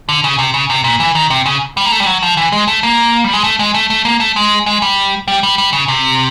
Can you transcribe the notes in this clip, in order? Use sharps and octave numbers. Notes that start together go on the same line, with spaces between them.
D3
C#3
C3
C#3
C3
A#2
E3
D#3
C3
C#3
G3
A#3
A3
G3
F#3
F3
E3
G#3
A3
A#3
G3
G#3
A3
G#3
A3
A3
A#3
A3
G#3
G#3
G3
G3
G3
G3
C#3
C3